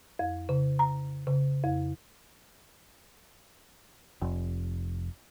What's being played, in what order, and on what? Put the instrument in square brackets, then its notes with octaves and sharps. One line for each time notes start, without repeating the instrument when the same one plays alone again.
[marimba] F2
C#3
A#5
C#3
F2
[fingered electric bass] F1